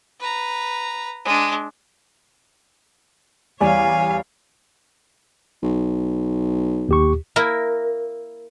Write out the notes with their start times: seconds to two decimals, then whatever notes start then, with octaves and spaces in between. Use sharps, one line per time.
0.20 B4 A#5
1.25 G#3 D4
3.61 E2 G3 C#5 D5 F5 G#5
5.63 B1
6.89 D#2 G4 C#6
7.36 A#3 E4 A#4